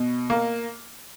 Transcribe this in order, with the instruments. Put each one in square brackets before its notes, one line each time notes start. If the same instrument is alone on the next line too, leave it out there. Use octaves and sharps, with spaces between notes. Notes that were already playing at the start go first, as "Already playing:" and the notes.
Already playing: [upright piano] B2
A#3